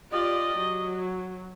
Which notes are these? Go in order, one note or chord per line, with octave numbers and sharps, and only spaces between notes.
F4 G4 D5 D#5
F#3